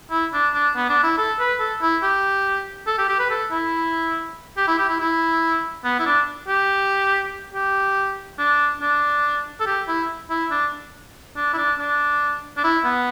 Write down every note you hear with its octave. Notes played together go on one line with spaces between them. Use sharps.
E4
D4
D4
B3
D4
E4
A4
B4
A4
E4
G4
A4
G4
G4
B4
A4
E4
G4
E4
G4
E4
E4
B3
E4
D4
G4
G4
D4
D4
A4
G4
E4
E4
D4
D4
E4
D4
D4
D4
E4
B3